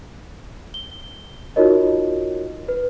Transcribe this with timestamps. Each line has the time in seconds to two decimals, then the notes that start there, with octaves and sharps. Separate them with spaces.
0.74 G7
1.56 D#4 F4 F#4 A#4 C#5 D#5
2.68 B4